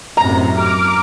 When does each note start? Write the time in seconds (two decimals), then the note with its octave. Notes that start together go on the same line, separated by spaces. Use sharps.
0.17 F#2 A2 C3 A#5
0.58 D6 F6